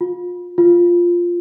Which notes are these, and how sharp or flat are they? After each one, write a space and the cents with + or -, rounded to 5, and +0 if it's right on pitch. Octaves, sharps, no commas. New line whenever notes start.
F4 +25
F4 +0